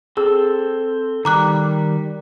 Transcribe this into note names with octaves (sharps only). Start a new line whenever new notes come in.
C4 G#4 A4 E6
D#3 G3 A#5 D6 F#6